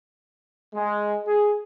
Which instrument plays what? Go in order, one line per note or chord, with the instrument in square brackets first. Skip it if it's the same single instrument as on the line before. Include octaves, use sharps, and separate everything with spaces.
[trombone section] G#3
G#4